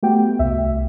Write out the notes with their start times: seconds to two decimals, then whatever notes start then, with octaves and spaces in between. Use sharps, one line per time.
0.03 A3 B3 F#4 G4 G5
0.39 C2 E5